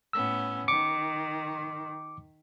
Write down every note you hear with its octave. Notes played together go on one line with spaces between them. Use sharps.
A2 B3 C#4 E6
D#3 D6 C#7